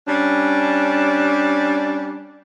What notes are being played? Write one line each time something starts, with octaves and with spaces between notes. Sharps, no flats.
G3 C#4 D4